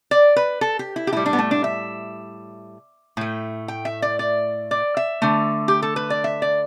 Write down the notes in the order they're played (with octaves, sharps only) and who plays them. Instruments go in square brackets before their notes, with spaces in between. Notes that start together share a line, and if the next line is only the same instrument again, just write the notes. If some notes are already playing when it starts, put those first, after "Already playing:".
[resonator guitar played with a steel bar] D5
B4
A4
G4
E4
G4
A2 G3 E4
D4
B3
A3
D4
E5
A2 A3
G5
E5
D5
D5
D5
E5
D3 A3
G4
A4
B4
D5
E5
D5